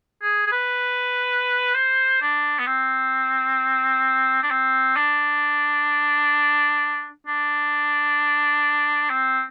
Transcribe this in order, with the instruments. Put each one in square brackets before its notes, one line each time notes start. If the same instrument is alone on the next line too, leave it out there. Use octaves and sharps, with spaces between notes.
[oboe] G#4
G#4
B4
C5
D4
B3
C4
D4
C4
D4
D4
C4